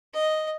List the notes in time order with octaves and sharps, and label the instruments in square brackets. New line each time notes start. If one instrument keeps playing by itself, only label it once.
[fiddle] D#5